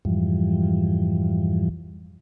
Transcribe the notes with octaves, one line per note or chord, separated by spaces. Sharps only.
F2 G#2 E3 F3 G3